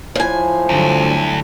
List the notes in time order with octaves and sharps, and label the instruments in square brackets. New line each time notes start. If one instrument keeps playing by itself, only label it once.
[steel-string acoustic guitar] A2 G#5 [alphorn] F3
[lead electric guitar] D2 [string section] G2 D3 F#3